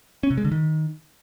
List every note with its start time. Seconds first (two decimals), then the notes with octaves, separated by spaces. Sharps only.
0.23 C#4
0.30 C3
0.37 G#3
0.45 D3
0.52 D#3